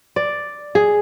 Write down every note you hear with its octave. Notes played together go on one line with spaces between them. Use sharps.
D5
G#4